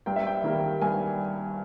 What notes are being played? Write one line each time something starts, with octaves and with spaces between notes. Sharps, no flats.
G2 G5
E5
G5
D#3 G3 A#3
G2 G#5